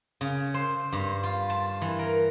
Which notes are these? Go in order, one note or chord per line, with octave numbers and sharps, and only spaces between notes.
C#3
C5
G2
F4
A5
E3
A#4